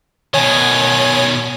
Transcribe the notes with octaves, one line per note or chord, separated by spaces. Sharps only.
B2 D#3 C#5 G#5